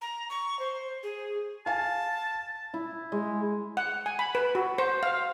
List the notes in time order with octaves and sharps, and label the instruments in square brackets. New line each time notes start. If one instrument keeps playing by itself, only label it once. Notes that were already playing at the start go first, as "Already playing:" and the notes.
[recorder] A#5
C#6
C5
G#4
[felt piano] F5 G#5 [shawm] A5
[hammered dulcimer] E4
G#3
[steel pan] F#5
G#5
B5
B4
F#4
C5
F5